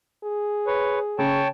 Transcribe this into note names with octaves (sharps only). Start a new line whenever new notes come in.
G#4
B4 C#5
C#3 C#5 G5 A5